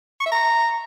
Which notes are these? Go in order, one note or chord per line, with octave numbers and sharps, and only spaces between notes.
C#6
E5
A#5